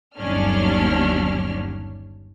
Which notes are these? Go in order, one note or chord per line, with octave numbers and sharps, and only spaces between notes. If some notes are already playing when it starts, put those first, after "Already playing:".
G1 D#2 F#3 C#4 D4 F6